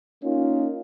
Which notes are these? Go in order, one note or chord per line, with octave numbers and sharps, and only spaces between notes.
A#3 C#4 D#4 F4